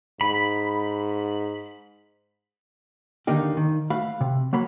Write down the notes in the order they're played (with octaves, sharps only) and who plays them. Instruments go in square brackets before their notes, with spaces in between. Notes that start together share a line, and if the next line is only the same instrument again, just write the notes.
[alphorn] G#2 [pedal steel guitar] B5
[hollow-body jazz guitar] D#2 D3 D#3 A#3 D#4 G4
D#3
A3 F#4 F5 B5
C3
F#3 A#3 C#5 B5